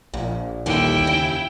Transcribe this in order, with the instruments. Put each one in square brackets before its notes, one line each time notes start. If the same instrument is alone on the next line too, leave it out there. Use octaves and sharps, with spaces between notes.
[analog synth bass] A#1 [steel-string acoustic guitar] A#2
[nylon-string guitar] D#2 [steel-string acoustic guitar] D3 D#3 G3 [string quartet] E4 G5
[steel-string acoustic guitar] C#3